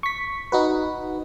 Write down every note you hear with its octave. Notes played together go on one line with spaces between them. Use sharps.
C#6 B6
D#4 F#4 B4